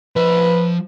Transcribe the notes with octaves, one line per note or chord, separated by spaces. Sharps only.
F3 B4 B5